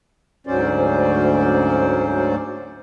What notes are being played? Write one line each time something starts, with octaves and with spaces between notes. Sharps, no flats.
D2 G#2 F#3 C#4 C5 D5